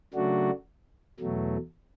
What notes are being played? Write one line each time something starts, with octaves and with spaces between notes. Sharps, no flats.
C#3 F#3 A3 D4 F#4
E2 B2 F#3 A3